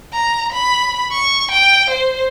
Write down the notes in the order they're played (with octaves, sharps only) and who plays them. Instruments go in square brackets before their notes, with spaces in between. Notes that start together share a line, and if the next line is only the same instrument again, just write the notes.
[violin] A#5
B5
C#6
G5
C5